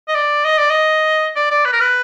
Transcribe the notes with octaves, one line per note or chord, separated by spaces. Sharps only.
D#5
D5
D#5
D5
D#5
D5
D5
B4
A#4
B4